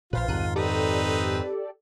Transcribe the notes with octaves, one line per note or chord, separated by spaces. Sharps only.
A#1 A#2 F4 B4 C5 F5
C2 F2 G#2 D#3 F#6 D#7
C4 D#4 G4 A4 B4 D5